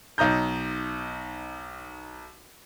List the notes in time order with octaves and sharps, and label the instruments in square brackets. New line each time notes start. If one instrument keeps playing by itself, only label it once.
[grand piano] B1 D#4 A#5 G6